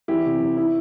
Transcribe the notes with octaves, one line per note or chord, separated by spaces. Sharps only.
E2 E4 G4
C3
E2
E4